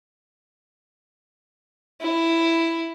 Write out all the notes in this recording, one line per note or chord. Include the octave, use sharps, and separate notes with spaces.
E4